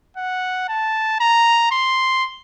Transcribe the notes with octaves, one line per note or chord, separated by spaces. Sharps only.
F#5
A5
A#5
C6